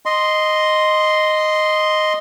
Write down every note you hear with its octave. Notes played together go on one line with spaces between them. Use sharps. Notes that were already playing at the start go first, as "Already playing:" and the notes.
D#5 C6